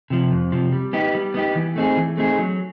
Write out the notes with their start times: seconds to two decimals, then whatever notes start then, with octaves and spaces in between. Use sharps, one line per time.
0.10 C3 F3
0.31 F2
0.52 C3 F3
0.72 G3
0.93 B3 D#4 G4
1.15 G3
1.34 B3 D#4 G4
1.55 E3
1.76 A3 C4 D#4 G#4
1.97 E3
2.17 A3 C4 D#4 G#4
2.38 F#3